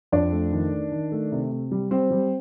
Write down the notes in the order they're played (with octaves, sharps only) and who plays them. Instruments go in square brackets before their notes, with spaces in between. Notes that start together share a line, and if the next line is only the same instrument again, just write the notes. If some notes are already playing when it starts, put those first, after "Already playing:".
[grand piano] F2 D4 D5
A3
D#3
D#3
D#3
A3
C3
C3
G3
G3 C4 C5
G3